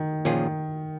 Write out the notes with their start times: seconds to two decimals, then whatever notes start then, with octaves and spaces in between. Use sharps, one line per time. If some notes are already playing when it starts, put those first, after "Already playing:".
Already playing: D#3
0.25 A#2 D#3 F3 C#4 F4 G#4